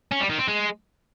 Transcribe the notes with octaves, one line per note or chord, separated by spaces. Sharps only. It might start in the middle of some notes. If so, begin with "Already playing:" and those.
C#4
G3
D#3
C4
G#3